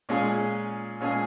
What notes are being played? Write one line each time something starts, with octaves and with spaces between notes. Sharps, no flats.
A#2 G#3 C#4 F4 G#4
A#2 G#3 C#4 F4 G#4